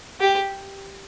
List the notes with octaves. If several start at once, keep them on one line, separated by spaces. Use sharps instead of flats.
G4